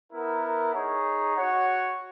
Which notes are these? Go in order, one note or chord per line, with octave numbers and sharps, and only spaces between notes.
B3 E4 A#4
D#4 G#4 C#5
F#4 C#5 F#5